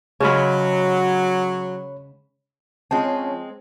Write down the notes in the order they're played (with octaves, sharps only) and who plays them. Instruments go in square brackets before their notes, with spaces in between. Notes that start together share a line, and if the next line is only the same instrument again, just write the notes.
[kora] C#3 G#3 C#4 [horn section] F#3 [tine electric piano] C#5 B5
[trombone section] F3 C#4 [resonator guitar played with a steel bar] G#3 C4 [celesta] A5